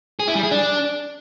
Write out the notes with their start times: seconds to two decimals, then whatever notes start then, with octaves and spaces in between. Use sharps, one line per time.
0.20 G#4
0.27 E4
0.35 G3
0.43 G#4
0.51 D4